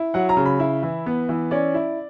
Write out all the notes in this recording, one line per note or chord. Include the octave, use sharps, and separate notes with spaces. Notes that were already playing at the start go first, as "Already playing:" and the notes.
Already playing: E4
F#3 F#5
A#5
C#3
B5
E4
E3
B3
E3
C#4 D5
E4